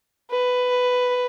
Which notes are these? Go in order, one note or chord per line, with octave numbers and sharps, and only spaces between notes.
B4